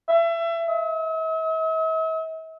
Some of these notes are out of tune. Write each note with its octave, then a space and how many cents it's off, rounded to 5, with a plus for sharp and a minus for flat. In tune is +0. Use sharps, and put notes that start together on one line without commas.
E5 +30
E5 -45